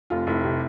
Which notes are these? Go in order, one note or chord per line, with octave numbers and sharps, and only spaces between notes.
F1 F4
F1 E4
C3